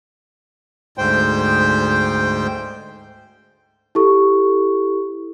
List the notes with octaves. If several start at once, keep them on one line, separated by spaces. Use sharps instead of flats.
D2 G#2 C5 G5
E4 G4 A4 C#6